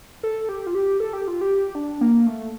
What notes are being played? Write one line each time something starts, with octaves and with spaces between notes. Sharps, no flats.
A4
G4
F4
G4
A4
G4
F4
G4
D4
A#3
A3